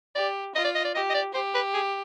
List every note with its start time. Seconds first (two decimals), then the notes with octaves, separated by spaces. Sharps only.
0.15 G4 D5
0.55 F4 D#5
0.65 D5
0.75 D#5
0.85 D5
0.95 G4 D#5
1.10 D#5
1.14 D5
1.34 G4 C5
1.54 B4
1.74 G#4